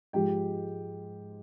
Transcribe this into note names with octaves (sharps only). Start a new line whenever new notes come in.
G#2 F3 G#3 G4 G5